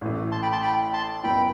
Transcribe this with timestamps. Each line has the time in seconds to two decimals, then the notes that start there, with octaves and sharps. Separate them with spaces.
0.01 A1 A2 E3 A3
0.32 A5 C6
0.42 G5 B5
0.52 A5 C6
0.62 G5 B5
0.93 A5 C6
1.23 F#1 F#2 F#3 B3 E4 G5 B5